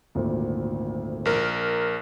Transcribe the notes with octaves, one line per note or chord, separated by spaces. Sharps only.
G#1 D2 A#2
A#1 A#4